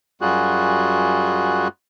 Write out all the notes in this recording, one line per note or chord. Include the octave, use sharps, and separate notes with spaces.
F#2 G3 F4 F#4 G#4 F#6